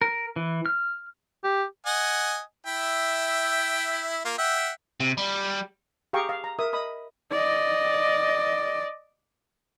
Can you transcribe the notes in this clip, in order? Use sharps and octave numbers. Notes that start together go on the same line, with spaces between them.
A#4
E3
F6
G4
D#5 F#5 G#5
E4 E5 G5
A#3 F4
E5 F#5 G5
C3
G3
G4 G#4 F5 G5 A#5 C#6
F5
A#5
A#4 E5 D#6
D#5 B5 D#6
D5 D#5